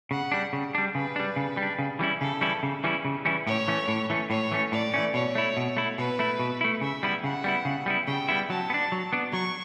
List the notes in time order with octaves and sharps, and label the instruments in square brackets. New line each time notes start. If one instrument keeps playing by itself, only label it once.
[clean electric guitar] C#3 [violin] F#5
[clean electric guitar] G3 D4
C#3
G3 D4
[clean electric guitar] C#3 [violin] B4
[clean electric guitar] G3 D4
C#3
G3
D4
C#3
E3 G3 C#4 E4
[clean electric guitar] C#3 [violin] A4
[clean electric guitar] E3 G3 C#4 E4
C#3
E3 G3 C#4 E4
C#3
E3 G3 C#4 E4
[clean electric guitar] A2 [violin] C#5
[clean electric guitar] E3 A3 C#4
A2
E3 A3 C#4
[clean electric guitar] A2 [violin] C#5
[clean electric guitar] E3 A3 C#4
[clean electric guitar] A2 [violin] D5
[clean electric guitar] E3 A3 C#4
[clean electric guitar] B2 [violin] C#5
[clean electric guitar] A3 E4
B2
A3 E4
[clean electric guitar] B2 [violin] B4
[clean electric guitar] A3 E4
B2
A3 E4
[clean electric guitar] C#3 [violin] E5
[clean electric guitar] G3 B3 E4
[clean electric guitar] C#3 [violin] F#5
[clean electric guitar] G3 B3 E4
C#3
G3 B3 E4
[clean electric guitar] C#3 [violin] G5
[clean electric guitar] G3 B3 E4
[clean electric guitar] F#3 [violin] A5
[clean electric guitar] B3
D4
F#3
B3 D4
[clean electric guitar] F#3 [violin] C#6